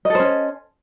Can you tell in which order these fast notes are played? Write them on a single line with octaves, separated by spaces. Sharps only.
D#5 A4 C5 C#4